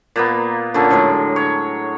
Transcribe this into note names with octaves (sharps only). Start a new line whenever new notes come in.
A#2 A#3 B3
A#2 D3 C#4 A4
A2 D3 F#3 G#3
C#5